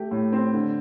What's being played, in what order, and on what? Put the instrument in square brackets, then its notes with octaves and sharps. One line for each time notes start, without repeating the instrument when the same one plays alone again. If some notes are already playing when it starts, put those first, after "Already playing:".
Already playing: [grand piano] A3 G4
A2
C4
D3